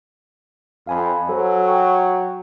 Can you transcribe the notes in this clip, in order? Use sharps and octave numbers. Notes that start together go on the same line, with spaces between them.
F2 F5 G#5 B5
F#3 A4 C5 G#5
G5 C#6